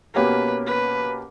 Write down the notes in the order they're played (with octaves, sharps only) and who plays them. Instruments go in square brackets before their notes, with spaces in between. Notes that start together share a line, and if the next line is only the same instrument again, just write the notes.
[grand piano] B2 A#3 C#4 G4 A#4 [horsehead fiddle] B4
[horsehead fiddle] B4